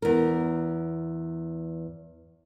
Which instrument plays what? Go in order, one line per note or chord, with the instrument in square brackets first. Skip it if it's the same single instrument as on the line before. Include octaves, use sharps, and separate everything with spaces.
[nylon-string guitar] E2 A#4